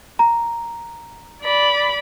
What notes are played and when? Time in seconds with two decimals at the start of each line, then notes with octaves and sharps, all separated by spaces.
0.19 A#5
1.43 D5 B5